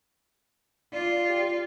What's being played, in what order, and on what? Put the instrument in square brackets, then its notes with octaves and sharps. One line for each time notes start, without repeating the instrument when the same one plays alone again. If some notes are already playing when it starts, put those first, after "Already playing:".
[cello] F4 [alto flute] D5
[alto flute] G4